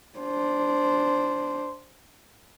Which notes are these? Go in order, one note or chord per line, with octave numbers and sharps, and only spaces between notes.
D4 C5